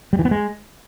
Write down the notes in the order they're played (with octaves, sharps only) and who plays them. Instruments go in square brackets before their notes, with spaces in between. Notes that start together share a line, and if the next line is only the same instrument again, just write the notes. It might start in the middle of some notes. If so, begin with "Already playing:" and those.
[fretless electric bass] G3
E3
B3
G#3